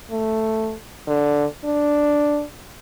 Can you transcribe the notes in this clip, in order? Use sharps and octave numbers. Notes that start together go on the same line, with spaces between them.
A3
D3
D4